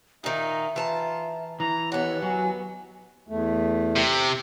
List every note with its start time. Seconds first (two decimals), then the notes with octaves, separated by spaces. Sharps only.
0.24 A#2 D#3 D#4 E5
0.76 E3 F4 A5 A#5
1.60 E3 A#5
1.92 D#2 B3 C#5 F#5
2.23 F#3 G#5
3.28 E2 A3
3.96 C3